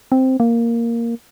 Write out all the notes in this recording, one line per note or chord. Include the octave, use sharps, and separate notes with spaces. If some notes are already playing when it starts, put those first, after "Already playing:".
C4
A#3